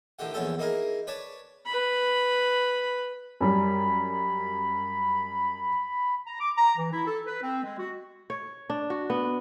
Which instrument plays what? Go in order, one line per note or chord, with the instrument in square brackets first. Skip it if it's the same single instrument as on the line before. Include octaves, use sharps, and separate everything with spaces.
[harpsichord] A2 D3 D#3 G4 F#5
A#1 E2 B3 C#4 A4 G5
A#3 D#4 E4 G#4 A#4
B4 C#5 D5 A5
[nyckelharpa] B4 B5
[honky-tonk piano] F#2 G3 [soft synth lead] B5
[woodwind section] A#5
D6
A#5
E3
E4
A4
B4
C4
G#3
F#4
[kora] C#5
D4
F#4
B3